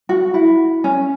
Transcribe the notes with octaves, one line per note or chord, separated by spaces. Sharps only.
F#4
E4
C#4